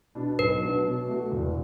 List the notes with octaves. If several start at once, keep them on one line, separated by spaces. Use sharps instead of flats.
B2 B3 D4
B1 B4
B2 F#3 D4 F#4
B2
A3 F#4
E1